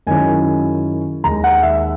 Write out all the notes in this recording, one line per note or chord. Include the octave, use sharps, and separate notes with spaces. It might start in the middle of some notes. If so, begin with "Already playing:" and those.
F#2 D#3 G#3 C#4 E4 G#5
D#2 D#3 G#3 A#5
F#5
E5